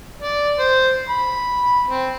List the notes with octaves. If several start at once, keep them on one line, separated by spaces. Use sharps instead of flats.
D5
C5
B5
C4